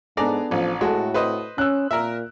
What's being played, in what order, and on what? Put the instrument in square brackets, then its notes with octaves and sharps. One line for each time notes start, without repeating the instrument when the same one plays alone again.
[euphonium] G#2 [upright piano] B3 D4 A4 [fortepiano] G#4 D5 A#5
[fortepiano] A1 [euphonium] F3
[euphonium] A2 [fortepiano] G#3 [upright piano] F#4 A4
[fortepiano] B4 C5 D#5
[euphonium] C#4 [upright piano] E6 F#6
[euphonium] A#2 [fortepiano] A#4 E5